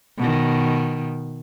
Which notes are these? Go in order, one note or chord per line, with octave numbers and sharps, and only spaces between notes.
B2 D#3